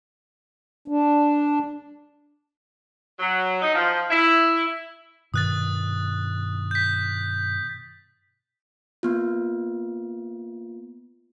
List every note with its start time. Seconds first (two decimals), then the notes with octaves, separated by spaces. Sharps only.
0.88 D4
3.20 F#3
3.62 D#4
3.75 F3
4.11 E4
5.34 G2 B2 D#3 D#6 F#6 A6
6.71 G6 B6
9.03 A#3 B3 F4